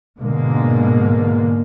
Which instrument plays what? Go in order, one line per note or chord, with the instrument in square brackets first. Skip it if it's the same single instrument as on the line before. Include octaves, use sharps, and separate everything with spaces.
[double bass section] G#2 B2 D3 G#3 A#3